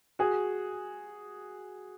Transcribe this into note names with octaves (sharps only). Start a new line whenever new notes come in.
F#4 G#4